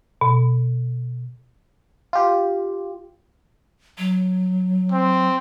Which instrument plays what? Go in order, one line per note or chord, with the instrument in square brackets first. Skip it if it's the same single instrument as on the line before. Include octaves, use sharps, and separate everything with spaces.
[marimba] B2
[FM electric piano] F4 G4
[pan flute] F#3
[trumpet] C4